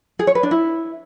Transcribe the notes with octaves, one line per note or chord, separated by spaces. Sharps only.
G#4
C#5
B4
D4
E4